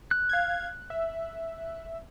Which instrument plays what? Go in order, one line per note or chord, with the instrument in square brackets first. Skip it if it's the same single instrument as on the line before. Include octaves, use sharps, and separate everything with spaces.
[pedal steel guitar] F#6
[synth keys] F5 G#6
E5